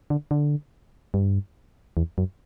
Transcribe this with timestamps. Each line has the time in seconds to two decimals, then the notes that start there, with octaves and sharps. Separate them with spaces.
0.10 D3
0.31 D3
1.14 G2
1.97 E2
2.18 F#2